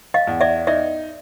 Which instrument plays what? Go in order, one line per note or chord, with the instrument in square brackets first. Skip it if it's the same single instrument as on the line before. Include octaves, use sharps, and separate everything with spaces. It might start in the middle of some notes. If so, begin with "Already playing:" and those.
[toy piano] D#5 F5
[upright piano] E2
[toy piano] D5 E5
[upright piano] D#4 [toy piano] D5 E5